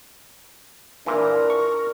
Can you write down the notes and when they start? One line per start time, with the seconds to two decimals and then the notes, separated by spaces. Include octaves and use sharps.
1.06 A#2 E3 D4 A#4
1.50 C#6